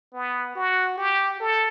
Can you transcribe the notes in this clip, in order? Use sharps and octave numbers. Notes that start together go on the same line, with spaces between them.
B3
F#4
G4
A4